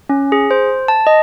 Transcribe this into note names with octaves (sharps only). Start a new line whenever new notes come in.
C#4
G#4
C5
A5
D#5